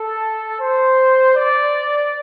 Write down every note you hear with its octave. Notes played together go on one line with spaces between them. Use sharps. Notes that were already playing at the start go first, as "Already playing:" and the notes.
Already playing: A4
C5
D5